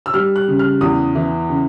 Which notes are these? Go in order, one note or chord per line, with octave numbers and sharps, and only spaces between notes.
E6
G3 F6
F#6
C#3
F6
E2 D#6
E3
C#3